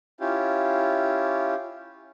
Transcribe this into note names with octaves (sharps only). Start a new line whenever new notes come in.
C#4 E4 F4 G4